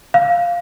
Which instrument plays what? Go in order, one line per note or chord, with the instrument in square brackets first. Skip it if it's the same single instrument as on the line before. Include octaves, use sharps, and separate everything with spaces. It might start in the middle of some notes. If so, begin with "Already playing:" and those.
[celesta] F5